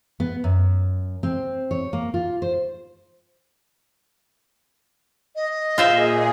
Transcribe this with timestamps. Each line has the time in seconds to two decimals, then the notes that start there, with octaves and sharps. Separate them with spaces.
0.20 B3
0.44 F#2
1.23 C4
1.71 C#5
1.93 A#3
2.14 F4
2.42 C5
5.35 D#5
5.78 A#2 F4 G#4 C5 E5